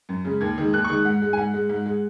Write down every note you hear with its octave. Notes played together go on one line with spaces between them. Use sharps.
F#2
C#3 G#3
D#2 G#6
D#3 G#3
D#2 F#6
C#6
D#3 G#3
G#2 F#5
G#3
G#5
G#2 F#5
G#3
G#2
G#3